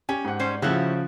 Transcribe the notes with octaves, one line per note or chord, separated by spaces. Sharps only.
C#4 G4 G#5
G#2 F#5
G3 C#4 C5
C#3 F3 E4 F#4 G4 F#5 E6 F#6